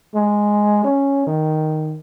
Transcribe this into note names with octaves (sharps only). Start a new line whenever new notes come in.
G#3
C#4
D#3